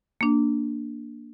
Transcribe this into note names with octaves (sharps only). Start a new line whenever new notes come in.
A#3 D4